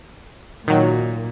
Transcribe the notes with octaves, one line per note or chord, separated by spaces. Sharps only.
A#2 D#3 F#3